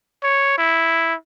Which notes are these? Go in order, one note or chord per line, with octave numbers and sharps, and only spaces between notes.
C#5
E4